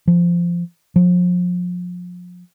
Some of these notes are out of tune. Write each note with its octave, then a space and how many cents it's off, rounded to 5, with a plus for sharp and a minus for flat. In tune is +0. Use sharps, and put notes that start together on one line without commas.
F3 -15
F3 +35